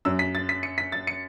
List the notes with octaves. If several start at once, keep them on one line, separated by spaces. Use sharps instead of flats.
F#2 F#3 E6
B6
A6
B6
C#7
B6
A6
C#7